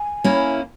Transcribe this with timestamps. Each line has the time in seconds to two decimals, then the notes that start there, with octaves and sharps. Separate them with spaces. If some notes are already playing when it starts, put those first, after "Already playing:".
Already playing: G#5
0.24 A#3 C#4 E4